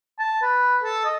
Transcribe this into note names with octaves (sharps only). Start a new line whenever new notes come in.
A5
B4
A4
D#5